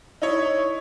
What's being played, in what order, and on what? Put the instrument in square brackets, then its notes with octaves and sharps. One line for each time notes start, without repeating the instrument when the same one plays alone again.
[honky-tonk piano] D#4 E4 C#5